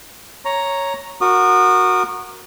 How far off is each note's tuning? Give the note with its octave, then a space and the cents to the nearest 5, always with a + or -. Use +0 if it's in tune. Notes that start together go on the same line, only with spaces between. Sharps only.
C#5 +0 A#5 +0
F#4 -10 A#4 +0 D#6 -35